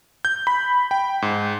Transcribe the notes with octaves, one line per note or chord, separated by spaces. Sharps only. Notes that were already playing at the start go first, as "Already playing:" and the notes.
G6
B5
G5
G#2